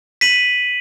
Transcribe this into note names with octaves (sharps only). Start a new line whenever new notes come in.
B6 D#7 F#7